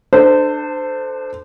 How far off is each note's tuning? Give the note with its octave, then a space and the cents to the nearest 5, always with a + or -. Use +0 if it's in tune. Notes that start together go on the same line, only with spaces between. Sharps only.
D4 +25 A4 +0 C5 -20